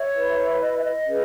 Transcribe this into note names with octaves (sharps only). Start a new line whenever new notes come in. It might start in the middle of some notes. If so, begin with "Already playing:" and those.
Already playing: C#5 E5
E4 B4
D#5
E5
D#5
C#4 G#4 B4